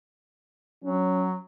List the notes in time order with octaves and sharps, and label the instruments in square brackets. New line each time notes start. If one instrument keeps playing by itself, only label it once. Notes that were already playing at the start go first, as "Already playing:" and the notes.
[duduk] F#3 [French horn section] C#4